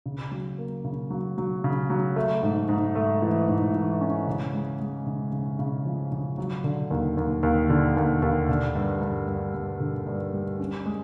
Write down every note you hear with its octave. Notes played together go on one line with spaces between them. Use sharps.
C#3
F#3
A#3
C#3
F#3
F#3
C#3
F#3
A3
G#2
G#2
A3
E3
G#2
E3
C#4
C#3
G#3
G#3
C#3
C#3
C#3
F3
C#3
F#3
D3
D#2
D#2
D#2
D3
D#2
D#2
D3
G2
G2
G2
G2
D3
G2
G3
C#4
G#3